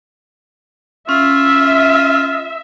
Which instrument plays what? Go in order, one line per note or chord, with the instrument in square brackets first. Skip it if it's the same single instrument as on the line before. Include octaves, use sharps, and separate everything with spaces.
[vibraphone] C#4 [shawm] F4 [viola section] E5